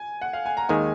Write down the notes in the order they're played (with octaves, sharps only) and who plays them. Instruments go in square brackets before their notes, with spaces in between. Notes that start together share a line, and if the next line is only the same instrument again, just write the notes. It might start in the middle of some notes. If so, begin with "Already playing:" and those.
Already playing: [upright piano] G#5
F#5
F5
G#5
A#5
[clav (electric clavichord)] D#2 D#3 G#3 [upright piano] G#5